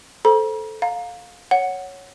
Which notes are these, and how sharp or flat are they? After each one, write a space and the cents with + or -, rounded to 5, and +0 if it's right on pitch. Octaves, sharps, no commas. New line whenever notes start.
A4 -5 C5 +0 A#5 +40
F5 +20 A#5 +0
C#5 +0 F#5 +0